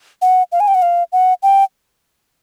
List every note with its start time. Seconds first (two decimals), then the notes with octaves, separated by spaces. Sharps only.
0.22 F#5
0.52 F5
0.60 G#5
0.68 G5
0.75 F#5
0.82 F5
1.12 F#5
1.43 G5